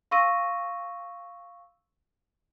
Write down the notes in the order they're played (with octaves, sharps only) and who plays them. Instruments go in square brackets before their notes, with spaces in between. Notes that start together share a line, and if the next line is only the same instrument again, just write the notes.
[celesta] F5 C6 C#6 E6 A#6 D#7